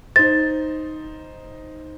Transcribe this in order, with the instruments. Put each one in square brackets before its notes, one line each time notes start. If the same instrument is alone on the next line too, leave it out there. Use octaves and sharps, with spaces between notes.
[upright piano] D#4 C5 [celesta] A6